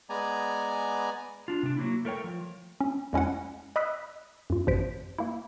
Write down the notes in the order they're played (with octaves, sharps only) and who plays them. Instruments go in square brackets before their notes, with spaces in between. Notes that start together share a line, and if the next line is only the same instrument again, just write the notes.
[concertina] G#3 B3 D5 G#5 A#5
[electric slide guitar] D4 F4
C3 D4
F#3 A#3 E4
A3 A#4 C#5 G5
F3
[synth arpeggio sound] C#4
F2 G#3 C#4 E4 F#5
D#5 B5 D#6 E6 F#6 B6
F#2 F4
A1 F#2 C3 C5 B6 D7
A#3 E4